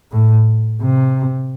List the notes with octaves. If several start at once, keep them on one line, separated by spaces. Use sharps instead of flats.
A2
C3